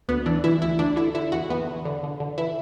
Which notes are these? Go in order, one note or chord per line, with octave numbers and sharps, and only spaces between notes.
D2 B3
E3 D4
E3 E4
D2 E4
D2 D4
D3 E4
D3 E4
E2 F#4
E2 B3
E2
D3
D3
D3
E3 E4